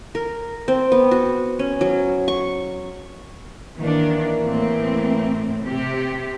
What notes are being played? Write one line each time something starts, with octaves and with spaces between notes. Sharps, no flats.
A#4
C4
B3
F#4
C#4
F#3
C#6
D#3 E3 A#3 D4
A2 C4
C3 C4 G4